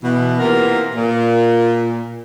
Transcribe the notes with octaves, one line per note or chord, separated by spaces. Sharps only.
B2 E3
C3 E3 A#3 B3 F4 A#4
A#2